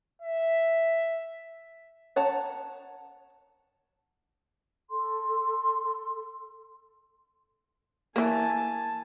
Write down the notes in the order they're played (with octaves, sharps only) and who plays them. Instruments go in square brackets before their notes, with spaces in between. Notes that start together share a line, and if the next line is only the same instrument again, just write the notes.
[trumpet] E5
[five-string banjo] C#5 F#5 A5 A#5
[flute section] A4 C6
[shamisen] E3 A#3 [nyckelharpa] G#5 A5